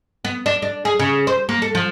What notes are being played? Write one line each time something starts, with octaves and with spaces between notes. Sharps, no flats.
B3
D4
D4
G#4
C#3
C5
A#3
A4
F3